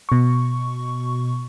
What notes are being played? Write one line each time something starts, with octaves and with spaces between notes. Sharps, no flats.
B2 C#6